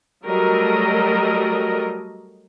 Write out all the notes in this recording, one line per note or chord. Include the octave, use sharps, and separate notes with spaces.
F#3 G3 A3 A4 A#4 D#5